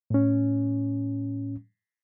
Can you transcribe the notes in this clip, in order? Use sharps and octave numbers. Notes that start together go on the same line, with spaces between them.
A2 C#4